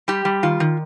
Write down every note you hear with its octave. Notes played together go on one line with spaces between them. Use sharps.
G3 G4
G3
D#3 F4
D#3